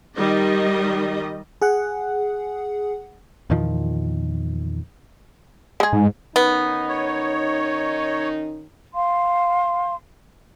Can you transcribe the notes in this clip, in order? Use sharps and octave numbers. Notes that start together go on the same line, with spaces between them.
D#3 G3 D#5
G#4 F#5
E2 A#2 D#3 F3
G#3 G#4
G#2
D#3 B3 C#4 D#4
C#5
F5 C6